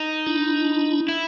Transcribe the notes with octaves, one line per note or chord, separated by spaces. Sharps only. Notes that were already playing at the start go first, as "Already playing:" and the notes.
Already playing: D#4
D4 E4
E4